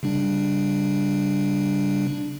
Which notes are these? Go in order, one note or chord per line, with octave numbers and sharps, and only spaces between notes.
C#3 G3 D4